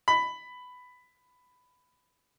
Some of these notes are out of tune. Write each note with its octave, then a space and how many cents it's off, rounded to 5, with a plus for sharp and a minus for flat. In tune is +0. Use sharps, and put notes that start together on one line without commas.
B5 +10